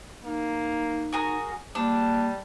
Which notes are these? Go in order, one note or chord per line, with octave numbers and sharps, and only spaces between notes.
A#3 D#4
F#4 G#4 A#4
G3 A#3 D4